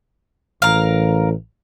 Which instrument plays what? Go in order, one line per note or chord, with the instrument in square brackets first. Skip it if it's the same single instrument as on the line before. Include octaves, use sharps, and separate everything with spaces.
[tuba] A1 [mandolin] A#4 F5